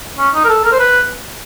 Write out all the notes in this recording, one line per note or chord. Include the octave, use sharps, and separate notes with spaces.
C#4
D#4
A#4
A4
A#4
C5
B4